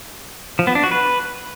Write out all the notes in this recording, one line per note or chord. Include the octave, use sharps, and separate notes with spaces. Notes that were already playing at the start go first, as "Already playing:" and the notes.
F3
B3
D4
F#4
B4